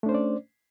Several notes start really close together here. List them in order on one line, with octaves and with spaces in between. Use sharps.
A3 D4 C5 C#4 D5